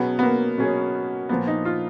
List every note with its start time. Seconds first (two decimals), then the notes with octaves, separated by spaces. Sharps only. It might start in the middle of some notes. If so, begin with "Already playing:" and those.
Already playing: B2 F#3 B3 C#4 G#4
0.19 B3
0.23 A#3
0.58 B2 F#3 C#4 G#4
1.29 A#2 F3 A#3 B3
1.47 D#4
1.65 F4